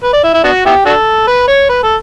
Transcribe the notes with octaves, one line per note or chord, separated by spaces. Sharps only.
B4
D5
E4
E4
B3 D4 F#4
B3 E4 G4
D4 F#4 A4
B4
C#5
B4
A4